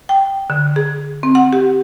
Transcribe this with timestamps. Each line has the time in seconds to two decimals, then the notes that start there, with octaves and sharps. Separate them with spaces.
0.09 G5
0.50 D3
0.76 G#4
1.23 C4
1.35 F#5
1.53 G4